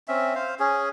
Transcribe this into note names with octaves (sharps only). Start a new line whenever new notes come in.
C4 C#4 E5
C5 F5
C#4 G#4